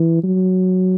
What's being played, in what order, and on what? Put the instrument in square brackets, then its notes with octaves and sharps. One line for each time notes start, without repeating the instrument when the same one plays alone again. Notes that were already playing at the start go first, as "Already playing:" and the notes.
Already playing: [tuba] E3
F#3